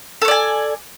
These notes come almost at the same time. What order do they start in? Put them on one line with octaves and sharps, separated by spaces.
A4 C#5 D5 G#5